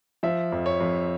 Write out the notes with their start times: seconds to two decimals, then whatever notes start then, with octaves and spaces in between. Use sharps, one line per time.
0.23 F3 E5
0.52 F2
0.66 C#5
0.81 F2